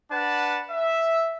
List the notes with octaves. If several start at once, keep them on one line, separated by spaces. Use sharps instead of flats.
D4 B4 F#5 A5
E5